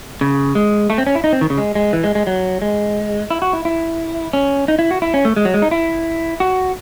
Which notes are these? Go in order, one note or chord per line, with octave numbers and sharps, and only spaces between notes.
C#3
G#3
A3
C4
C#4
E4
D#4
C4
D#3
C#3
G#3
G#3
E3
G#3
G#3
F#3
G#3
E4
F#4
E4
E4
C#4
D#4
E4
F#4
E4
C#4
A3
G#3
F#3
G#3
D#4
E4
F#4